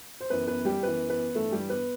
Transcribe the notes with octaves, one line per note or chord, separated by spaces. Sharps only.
C5
F#2 E3 B3 B4
B3 B4
G3 G4
F#2 E3 B3 B4
B3 B4
G2 E3 A3 A4
G3 G4
B3 B4